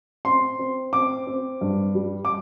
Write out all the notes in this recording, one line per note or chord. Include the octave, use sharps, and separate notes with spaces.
C4 C6
C4
C4 D6
C4
G2
G3
D6